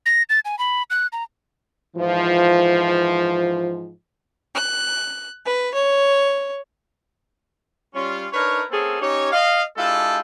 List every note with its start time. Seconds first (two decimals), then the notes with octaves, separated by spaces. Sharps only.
0.06 A#6
0.30 A6
0.45 G#5
0.59 B5
0.90 F#6
1.13 A#5
1.96 G#2 E3 F3
4.55 F#6
5.46 B4
5.75 C#5
7.94 G3 C#4 F4
8.32 D4 D#4 A#4 B4 C#5
8.70 A#3 C4 C#4 G#4 A4
9.01 C#4 D#4 G4 C#5
9.32 D#5 F5
9.77 G#3 D4 E4 F4 G4 A4